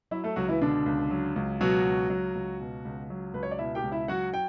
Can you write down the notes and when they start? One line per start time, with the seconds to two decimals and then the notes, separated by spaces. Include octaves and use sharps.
0.11 F#3 E4 E5
0.24 A3 A4
0.36 C#2 F#3 F#4
0.48 E3 E4
0.61 B2 D3 D4
0.86 C#2
1.11 F#3
1.36 C#2
1.60 B2 F#3 F#4
1.85 C#2
2.10 F#3
2.35 C#2
2.60 B2
2.85 C#2
3.10 F#3
3.34 C#2 B4
3.43 C#5
3.51 D5
3.59 B2 E4 E5
3.75 G4 G5
3.83 C#2
3.92 E4 E5
4.08 F#3 F#4 F#5
4.34 G5